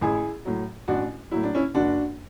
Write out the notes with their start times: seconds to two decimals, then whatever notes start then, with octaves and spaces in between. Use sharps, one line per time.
0.01 A1 E4 G#4
0.45 A2 F#3
0.88 A1 D4 F#4
1.31 A2 F#3 E4
1.43 D4
1.55 C#4 E4
1.74 F#1 D4 F#4